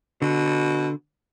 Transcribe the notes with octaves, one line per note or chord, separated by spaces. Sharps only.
B2 D3